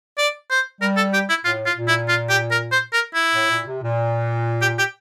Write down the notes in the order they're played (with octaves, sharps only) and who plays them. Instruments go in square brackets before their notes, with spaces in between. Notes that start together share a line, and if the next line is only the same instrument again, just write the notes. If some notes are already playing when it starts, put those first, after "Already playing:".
[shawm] D5
C5
[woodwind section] G3 [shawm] A#4
[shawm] A4
G4
E4
[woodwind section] A2 [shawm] F4
[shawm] F4
[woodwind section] A#2
[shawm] E4
F4
G4
A#4
C5
A#4
E4
[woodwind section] A2
A#2
C3
A#2
[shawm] G4
G4